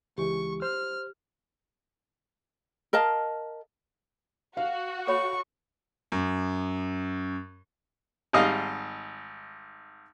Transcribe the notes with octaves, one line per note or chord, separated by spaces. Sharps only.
C#2 E3 G#3 G4 C#6
C5 F6
A#4 D#5 F5 A5
F#4 F5
A4 C#5 B5 C#6
F#2
G#1 G3 D#4 D#5 F5